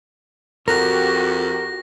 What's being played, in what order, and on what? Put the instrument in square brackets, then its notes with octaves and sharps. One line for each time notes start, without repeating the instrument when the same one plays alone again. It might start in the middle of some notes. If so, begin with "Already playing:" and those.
[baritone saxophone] F2 [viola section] F#4 G4 [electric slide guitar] A#4 [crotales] A#6